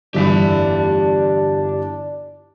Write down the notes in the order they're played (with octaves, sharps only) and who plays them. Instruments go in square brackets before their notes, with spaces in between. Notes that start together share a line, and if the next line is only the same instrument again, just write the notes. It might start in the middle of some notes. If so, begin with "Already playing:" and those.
[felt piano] G1 E3 B6 [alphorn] D4 [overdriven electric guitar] G4 F5